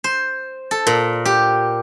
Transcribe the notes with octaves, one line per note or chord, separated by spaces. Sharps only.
C5
A4
A#2
G4